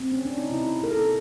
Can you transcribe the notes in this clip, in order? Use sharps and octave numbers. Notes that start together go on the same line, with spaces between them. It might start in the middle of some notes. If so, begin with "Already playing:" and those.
C4
C#4
D4
D#4
C3 E4
C3 A#4
A4